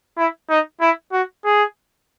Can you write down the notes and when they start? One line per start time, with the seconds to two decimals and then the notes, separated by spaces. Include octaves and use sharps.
0.18 E4
0.50 D#4
0.81 E4
1.12 F#4
1.45 G#4